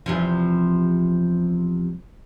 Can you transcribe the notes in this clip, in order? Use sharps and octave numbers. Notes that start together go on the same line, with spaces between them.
E2 C3 F3